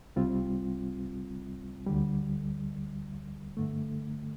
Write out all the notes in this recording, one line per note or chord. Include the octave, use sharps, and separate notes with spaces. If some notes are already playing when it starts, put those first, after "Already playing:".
C2 C3 G3 C4 F4
D2 D3 G3
G2 D3 A3